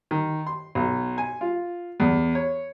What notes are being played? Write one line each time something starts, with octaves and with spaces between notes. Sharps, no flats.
D#3
C6
B1
G#5
F4
E2
C#5